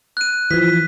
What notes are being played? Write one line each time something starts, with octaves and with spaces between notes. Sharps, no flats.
F#6 D#7
E3 F3 B6